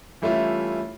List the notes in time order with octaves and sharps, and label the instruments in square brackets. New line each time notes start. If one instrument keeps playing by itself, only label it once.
[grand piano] E3 G3 A3 C#4 E4 F4